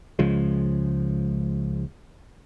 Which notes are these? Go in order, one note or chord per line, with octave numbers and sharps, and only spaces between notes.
C#2 C#3 F3 G#3